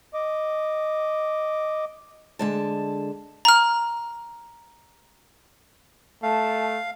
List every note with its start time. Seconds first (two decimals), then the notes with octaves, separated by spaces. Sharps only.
0.14 D#5 D6
2.39 D3 G#3 A5
3.45 A#5 F6
6.23 A3 F5 A5